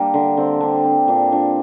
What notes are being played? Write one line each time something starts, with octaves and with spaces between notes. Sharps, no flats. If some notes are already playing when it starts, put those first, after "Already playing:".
Already playing: G3 A#3 D4
D3
D3 C4
G3 D4
C4
A#2 D4
A#2 D4